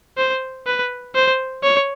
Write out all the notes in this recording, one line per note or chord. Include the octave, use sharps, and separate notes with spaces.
C5
B4
C5
C#5